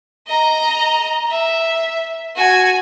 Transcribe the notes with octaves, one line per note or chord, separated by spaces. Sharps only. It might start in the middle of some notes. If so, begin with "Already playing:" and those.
D#5 A#5
E5
F#4 G#5